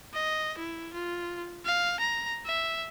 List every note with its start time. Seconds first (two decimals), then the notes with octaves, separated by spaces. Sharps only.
0.13 D#5
0.58 E4
0.93 F4
1.65 F5
2.00 A#5
2.46 E5